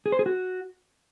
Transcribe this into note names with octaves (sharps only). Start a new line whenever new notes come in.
G#4
C5
G#4
F#4